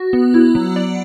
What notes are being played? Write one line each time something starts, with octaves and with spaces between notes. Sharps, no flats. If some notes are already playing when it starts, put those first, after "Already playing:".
Already playing: F#4
B3
E4
F#3
D5